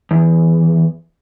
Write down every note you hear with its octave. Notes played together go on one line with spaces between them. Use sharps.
E2